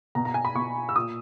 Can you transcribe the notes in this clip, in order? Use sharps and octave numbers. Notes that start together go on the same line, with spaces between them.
B2 A#5
A#5
G#5
B5
B2 C#6
E6
A#2 D#6